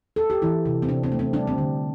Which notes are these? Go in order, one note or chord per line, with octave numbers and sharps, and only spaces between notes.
A4
G4
E3 E4
C3
C4
C3 D4
C4
A3
C4
G3 D4
C4
D3